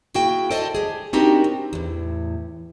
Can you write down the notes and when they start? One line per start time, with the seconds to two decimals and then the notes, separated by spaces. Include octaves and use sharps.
0.14 A#3 E4 F#4 G#4 G5
0.51 A4 C5 D5 D#5 G#5 A5
0.75 G4 G#4
1.13 C4 D4 D#4 F#4 G4 A#4
1.44 C4
1.73 E2 A2